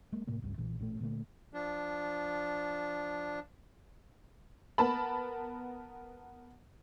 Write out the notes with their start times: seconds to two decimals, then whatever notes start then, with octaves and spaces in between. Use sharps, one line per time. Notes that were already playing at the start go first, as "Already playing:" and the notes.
0.12 F#3 G#3 A#3
0.27 A2 C3 A#3
0.42 G1 C#2 G2 C#3
0.58 B1 A#2 E3
0.79 A1 A#2 C#3 A3
1.01 A#2 D3 F#3 A3
1.53 F3 D4
4.78 B3 A#4 A5 B5